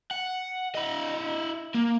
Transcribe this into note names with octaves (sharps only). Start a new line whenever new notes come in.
F#5
E4 D#5
A#3